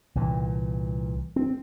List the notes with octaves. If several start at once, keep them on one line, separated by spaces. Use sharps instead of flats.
C2 A#2 E3
C4